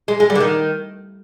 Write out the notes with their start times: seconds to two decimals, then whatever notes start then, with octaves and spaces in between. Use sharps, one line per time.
0.08 G#3
0.20 G#3
0.30 G3
0.35 D3
0.40 D#3